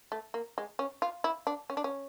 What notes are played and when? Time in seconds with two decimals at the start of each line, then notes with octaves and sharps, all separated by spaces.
0.12 A3
0.34 A#3
0.58 G#3
0.79 C#4
1.02 F4
1.24 E4
1.47 D4
1.70 C#4
1.77 D4
1.84 C#4